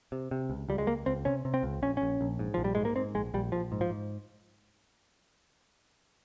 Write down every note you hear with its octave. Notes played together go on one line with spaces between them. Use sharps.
C3
C3
C#2
C#2 G3
G#3
C#2 A#3
C#2 C4
C3 C#4
C3
C4
C#2
A#1 C#4
A#1 C#4
A#1
G#2
A#1 F3
G3
G#2 G#3
A#3
G#2 C4
A#1 G#3
A#1 G3
A#1 F3
G#2
F3
G#2